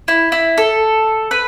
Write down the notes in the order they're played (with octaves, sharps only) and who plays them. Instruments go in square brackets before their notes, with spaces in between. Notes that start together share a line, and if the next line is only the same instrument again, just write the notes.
[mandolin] E4
E4
A4
B4